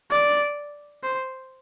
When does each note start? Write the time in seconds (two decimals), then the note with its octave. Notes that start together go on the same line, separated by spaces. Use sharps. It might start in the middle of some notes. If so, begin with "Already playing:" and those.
0.12 D5
1.03 C5